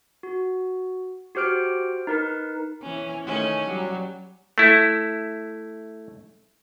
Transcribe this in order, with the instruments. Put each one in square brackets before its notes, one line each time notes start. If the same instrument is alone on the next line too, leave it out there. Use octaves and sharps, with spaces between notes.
[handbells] F#4
F#4 G4 C5 F6 D7
D#4 A#4 B4
[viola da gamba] E3 C#4
D#3 A3 C#4
F#3 G3
[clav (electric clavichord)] A3 E4